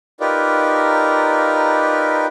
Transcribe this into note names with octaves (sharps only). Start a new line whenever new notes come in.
D#4 F4 G4 A#4 B4 D5